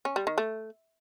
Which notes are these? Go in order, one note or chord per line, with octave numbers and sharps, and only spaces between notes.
C#4
G3
D#3
A3